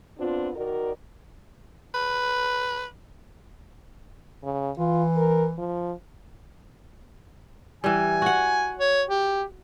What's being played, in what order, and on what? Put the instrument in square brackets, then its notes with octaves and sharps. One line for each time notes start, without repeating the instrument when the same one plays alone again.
[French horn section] B3 C4 D4 F4
D#3 F#4 A#4 D5
[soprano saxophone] B4
[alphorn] C#3
[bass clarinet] E3 [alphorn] F4
[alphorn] A#4
F3
[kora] E3 G3 [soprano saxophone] G#5
[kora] F#4 F#5
[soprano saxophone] C#5
G4